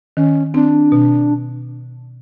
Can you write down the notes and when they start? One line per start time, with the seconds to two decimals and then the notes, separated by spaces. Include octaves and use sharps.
0.17 D#3 C#4
0.54 C4 D4
0.92 B2